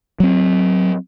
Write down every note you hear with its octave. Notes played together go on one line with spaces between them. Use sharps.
F#3 C4